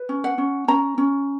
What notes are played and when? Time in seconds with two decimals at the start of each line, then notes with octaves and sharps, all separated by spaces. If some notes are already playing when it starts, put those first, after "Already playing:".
Already playing: B4
0.09 C#4
0.24 F#5
0.38 C#4
0.68 C#4 A#5
0.98 C#4